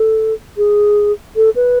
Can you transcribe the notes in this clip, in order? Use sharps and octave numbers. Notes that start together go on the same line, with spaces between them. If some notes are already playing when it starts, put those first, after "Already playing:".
Already playing: A4
G#4
A4
B4